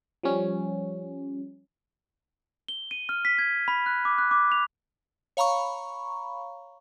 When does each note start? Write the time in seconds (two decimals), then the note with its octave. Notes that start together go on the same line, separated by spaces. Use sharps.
0.23 F3 G3 C#4
2.68 G7
2.91 D#7
3.09 F6
3.25 B6
3.39 G#6
3.68 B5
3.86 F#6
4.05 D6
4.18 F#6
4.31 D6
4.52 F7
5.37 C#5 F5 A#5 B5 C#6